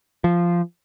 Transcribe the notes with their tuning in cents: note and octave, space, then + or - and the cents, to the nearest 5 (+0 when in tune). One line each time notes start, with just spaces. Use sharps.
F3 -10